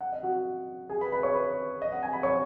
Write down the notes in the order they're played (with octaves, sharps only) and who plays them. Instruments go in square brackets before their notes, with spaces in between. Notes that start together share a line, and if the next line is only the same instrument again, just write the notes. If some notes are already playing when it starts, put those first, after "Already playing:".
[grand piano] F#5
D#5
F#4 F#5
G#4 G#5
B4 B5
B4 B5
C#5 C#6
B4 B5
D#5
F#5
G#5
B5
C#5 C#6